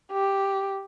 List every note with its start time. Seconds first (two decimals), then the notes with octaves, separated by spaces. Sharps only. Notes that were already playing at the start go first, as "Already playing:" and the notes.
0.12 G4